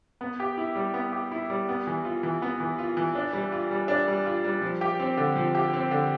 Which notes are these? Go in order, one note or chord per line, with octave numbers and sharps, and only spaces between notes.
B3
G4
E4
G3
B3
G4
E4
G3
B3
E3
F4
E3
B3
E3
F4
E3
D4
G3
F4
G3
D4
G3
F4
G3
F3
G4
C4
D3
F3
G4
C4
D3